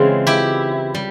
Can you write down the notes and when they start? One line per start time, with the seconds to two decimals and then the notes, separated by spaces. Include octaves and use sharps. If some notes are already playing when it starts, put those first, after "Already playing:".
Already playing: C#3 E3 G#3 C4 F4
0.27 E4 G4
0.95 G3